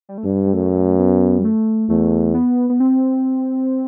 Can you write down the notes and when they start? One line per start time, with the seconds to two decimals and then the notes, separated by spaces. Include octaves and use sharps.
0.09 G3
0.18 A3
0.24 G2 G3
0.47 G3
0.53 F#2 A3
0.99 B3
1.39 G3
1.45 A3
1.89 E2 A3
2.34 B3
2.70 B3
2.80 C4